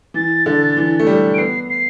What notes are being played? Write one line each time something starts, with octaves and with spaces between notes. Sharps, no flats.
E3 A6
D3
E3
A3
G3
D7
B3 C7
C7